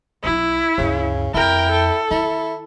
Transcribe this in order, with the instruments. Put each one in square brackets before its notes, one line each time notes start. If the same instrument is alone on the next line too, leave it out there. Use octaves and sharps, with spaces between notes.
[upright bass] B1 D4 [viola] E4
[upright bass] D2 G2 [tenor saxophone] C#3
[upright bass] F2 D#3 [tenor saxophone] E4 [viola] A#4 G5
[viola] A4
[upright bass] D#3 [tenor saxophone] E4